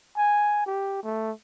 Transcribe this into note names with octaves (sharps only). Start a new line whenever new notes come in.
G#5
G4
A3